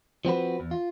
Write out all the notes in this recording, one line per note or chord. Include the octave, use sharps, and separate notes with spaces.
F3 C4 F#4 B4
E2
F4